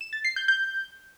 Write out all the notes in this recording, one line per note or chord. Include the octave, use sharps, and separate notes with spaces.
E7
A6
C7
G6
G6